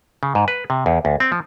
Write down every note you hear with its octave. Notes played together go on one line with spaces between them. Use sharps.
C#3
G#2
B4
C3
E2
D2
C4
F3